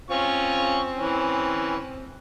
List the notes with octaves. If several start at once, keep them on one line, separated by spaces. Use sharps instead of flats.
C4 C#4 F4 C#6
E3 C#4
C4